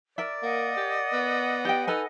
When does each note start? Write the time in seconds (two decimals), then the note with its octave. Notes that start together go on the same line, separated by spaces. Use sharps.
0.18 A#4 D5 E5
0.43 A#3 D#5 F#5
0.77 G4
1.13 B3
1.65 G4 G5
1.87 D#4 A4 B4 G#5